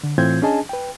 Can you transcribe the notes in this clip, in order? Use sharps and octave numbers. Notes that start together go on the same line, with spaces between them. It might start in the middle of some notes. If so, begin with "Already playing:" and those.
D3
A2 E3 C4 F4 G6 G#6
C#4 D4 G#4 D#5 G#5 A5
B4 G5